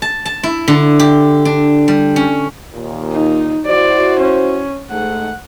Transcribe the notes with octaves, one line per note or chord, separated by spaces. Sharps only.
A5
A5
E4
D3
G4
D4
G3
C#4
D#2 A#2
D#4
E4 F#4 C5 D5
C#4
G#2 A3 F#5